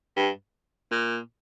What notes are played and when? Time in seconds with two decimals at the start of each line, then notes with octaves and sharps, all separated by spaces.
0.16 G2
0.91 A#2